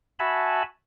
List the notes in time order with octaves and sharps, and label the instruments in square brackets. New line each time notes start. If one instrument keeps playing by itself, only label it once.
[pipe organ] F#4 E5 G#5 A5 B5